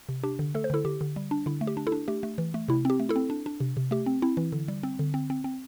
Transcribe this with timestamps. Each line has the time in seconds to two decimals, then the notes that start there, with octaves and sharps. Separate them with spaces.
0.09 C3
0.23 D4 G4
0.39 D3
0.55 A3 A4
0.64 C5
0.70 D3 E4 A4
0.85 D3 G4
1.01 D3
1.16 G3
1.31 D4
1.46 D3 E4
1.61 A3
1.67 G4
1.77 D4
1.87 E4 A4
1.92 D4
2.08 A3 G4
2.23 A3
2.38 E3
2.54 A3
2.68 C3 E4
2.85 C4 G4
2.99 A3
3.09 E4 A4
3.16 C4
3.30 D4
3.46 D4
3.60 C3
3.77 C3
3.91 A3 G4
4.06 C4
4.22 C4 E4
4.37 E3
4.52 D3
4.68 G3
4.83 C4
4.99 D3
5.14 C4
5.30 C4
5.44 C4